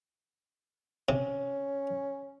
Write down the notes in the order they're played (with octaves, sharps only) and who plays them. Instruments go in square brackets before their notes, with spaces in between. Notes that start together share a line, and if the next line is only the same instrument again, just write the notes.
[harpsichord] C3 [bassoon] C#4